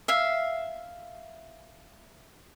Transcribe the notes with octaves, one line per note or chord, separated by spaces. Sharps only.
E5 F5